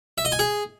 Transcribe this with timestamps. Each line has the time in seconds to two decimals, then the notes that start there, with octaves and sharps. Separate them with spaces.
0.18 E5
0.25 D#5
0.32 G#5
0.39 G#4